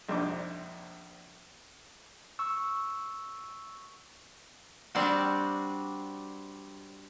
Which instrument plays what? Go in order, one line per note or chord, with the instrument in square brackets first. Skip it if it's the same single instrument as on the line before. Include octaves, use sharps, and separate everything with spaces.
[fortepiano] A#1 F2 C3 D4 D#4 D6
[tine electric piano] C#6 E6
[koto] G3 C4 D4 F#4